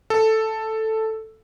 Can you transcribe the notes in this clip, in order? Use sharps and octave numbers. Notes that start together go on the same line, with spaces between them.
A4